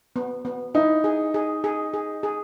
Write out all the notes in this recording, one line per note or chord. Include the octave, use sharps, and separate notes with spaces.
B3
B3
D#4 E4
G#4
G#4
G#4
G#4
G#4